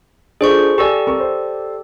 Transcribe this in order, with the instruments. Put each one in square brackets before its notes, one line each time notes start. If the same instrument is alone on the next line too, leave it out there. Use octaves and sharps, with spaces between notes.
[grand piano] D4 F4 A4 [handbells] G#4 C5 C#6
[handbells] G4 A4 D5 [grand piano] G#5 C#6
[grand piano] C4 A#4 C#6
C5